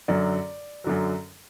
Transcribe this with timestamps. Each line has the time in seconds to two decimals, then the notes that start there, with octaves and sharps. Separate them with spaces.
0.08 F#2 D3 F#3 D5
0.84 F#2 D3 F#3